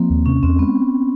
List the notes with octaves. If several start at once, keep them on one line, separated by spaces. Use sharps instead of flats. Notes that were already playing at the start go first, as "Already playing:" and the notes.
Already playing: F3 A#3 C4
D#2
C3 C#4
E2 C4
G#3 B3